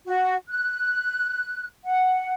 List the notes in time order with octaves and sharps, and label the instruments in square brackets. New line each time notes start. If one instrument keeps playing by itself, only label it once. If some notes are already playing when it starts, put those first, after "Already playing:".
[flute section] F#4
F#6
F#5